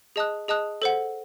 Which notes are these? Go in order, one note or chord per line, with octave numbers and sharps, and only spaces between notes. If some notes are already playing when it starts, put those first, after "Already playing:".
G#4 D#5 A5 D#6 F#6
G#4 D#5 A5 D#6 F#6
A4 C5 F#5